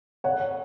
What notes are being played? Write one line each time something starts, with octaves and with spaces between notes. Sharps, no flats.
C#5 F#5